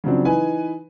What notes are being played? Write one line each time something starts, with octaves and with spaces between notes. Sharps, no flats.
C#3 F3 F#3 C4 D4
E3 D#4 B4 G#5